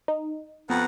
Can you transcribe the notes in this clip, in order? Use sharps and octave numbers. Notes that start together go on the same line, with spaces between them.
D#4
F2 B3 B4 F#5 A#5